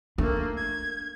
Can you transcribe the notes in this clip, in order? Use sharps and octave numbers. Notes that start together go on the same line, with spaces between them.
A3 A#3 D4
G#6